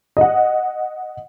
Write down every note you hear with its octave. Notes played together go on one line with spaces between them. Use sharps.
D#5 F#5